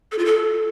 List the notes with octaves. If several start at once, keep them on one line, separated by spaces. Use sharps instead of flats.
A4
F4
A4